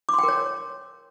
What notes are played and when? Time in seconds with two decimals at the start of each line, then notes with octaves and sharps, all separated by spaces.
0.09 D6
0.14 C6
0.19 G5
0.23 A#4
0.28 C#5